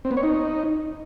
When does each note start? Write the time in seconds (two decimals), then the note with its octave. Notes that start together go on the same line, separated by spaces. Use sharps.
0.05 C4
0.11 B3
0.17 C#5
0.23 D#4